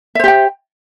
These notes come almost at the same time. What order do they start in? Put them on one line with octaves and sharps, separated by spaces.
E5 C5 G4 G5